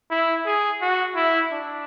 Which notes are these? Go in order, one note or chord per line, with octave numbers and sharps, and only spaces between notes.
E4
G#4
F#4
E4
D4